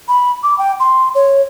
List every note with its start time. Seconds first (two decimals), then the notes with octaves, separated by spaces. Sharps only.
0.08 B5
0.43 D6
0.58 G5
0.80 C6
1.15 C#5